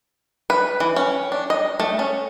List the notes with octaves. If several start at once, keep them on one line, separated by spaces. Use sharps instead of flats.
B4
E3
C#4
D4
D#5
A3
C#4